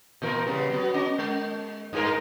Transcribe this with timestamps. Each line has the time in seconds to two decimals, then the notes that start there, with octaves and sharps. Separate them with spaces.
0.22 A#2 E3 A#4
0.47 C#3 G3 B3
0.70 F#3 B3
0.94 C#4 D#5
1.18 G#3
1.93 G2 G#4 A#4